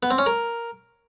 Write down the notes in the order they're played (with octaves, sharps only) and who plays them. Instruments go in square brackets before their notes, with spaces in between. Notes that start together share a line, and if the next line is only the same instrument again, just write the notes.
[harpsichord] B3
C4
C#4
A#4